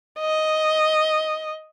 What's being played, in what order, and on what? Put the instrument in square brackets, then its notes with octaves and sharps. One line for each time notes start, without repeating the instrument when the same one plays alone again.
[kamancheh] D#5